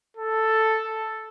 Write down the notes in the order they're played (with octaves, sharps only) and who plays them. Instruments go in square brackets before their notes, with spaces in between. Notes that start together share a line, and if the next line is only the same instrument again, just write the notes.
[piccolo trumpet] A4